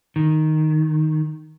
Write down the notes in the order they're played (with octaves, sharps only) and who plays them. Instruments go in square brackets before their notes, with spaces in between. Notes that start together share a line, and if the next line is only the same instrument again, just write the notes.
[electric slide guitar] D#3